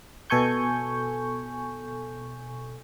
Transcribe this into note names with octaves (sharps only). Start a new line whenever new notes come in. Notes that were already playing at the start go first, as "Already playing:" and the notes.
B2 A4 G#5 C#6 G6